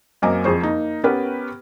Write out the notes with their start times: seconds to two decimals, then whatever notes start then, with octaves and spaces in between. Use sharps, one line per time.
0.22 F#2 A#3 C4 D#5 G#5 D6
0.44 F2 G#4 C5 C#6
0.61 A#3 D#4
1.04 B3 C#4 G4 A#4 B4